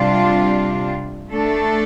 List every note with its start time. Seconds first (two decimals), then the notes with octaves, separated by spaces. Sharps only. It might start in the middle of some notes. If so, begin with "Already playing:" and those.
Already playing: C3 G3 D4 F4
1.30 A3 D4 A4